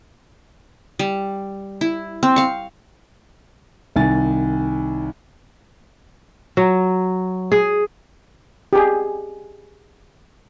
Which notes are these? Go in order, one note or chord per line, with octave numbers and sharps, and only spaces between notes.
G3
E4
C4
F5 C#6
C2 D#3 G#5 A6
F#3
G#4
G4 G#4